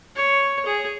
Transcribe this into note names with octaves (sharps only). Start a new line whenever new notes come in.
C#5
G#4